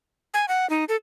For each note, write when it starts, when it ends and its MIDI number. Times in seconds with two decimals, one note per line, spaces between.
0.34 0.46 80
0.48 0.69 78
0.70 0.84 63
0.89 0.96 69